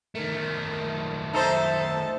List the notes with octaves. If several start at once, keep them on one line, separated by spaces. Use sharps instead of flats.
D#3 A3 A#4
D#4 A4 C5 E5 A5